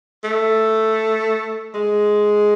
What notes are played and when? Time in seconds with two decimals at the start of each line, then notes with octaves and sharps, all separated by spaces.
0.24 A3
1.74 G#3